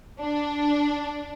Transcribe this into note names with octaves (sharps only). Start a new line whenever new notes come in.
D4